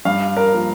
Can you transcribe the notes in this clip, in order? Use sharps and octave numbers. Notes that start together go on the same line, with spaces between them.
G2 F5
A#4
F3 A#3